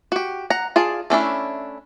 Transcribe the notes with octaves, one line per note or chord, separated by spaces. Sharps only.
F#4 G4
F#5 A#5
F4 G#4 D5 A5
A3 C#4 D4 E4